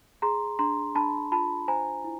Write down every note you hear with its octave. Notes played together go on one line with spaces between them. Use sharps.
G#4 A#5 C6
D4 A#5 C6
D4 A5 B5
F4 A5 B5
C5 G#5 A#5
E4